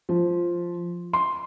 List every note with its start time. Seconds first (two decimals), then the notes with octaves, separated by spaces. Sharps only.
0.09 F3
1.13 C6